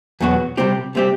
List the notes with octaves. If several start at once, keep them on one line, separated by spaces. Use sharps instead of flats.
E2 B2 F#3 B3 F#4
C2 C3 G3 C4 G4
C3 G3 C4 G4